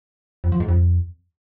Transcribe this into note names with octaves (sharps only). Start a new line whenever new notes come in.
F2
F3
G#2
F2